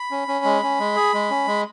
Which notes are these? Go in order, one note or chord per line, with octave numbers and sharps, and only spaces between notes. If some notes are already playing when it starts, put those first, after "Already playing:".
Already playing: B5
C#4
C#4
G#3
C#4
G#3
G#4
G#3
C#4
G#3